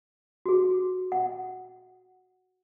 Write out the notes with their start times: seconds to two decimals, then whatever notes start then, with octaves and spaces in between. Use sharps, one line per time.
0.46 F#4 G#4
1.12 F#5